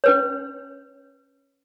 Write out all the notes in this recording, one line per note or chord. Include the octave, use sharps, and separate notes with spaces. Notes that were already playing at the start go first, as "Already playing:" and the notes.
C#4 B4 C#5